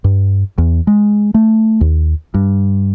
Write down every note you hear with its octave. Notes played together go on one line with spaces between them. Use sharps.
G2
E2
G#3
A3
D#2
G2